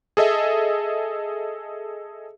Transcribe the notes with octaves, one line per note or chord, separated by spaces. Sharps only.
G#4 A4 D#5 E5